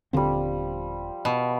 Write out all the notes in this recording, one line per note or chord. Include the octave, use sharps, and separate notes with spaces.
D#1 D3 F3 G3 C4
B2